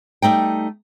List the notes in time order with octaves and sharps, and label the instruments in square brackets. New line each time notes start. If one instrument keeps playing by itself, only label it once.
[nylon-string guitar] G3 A3 D#4 G5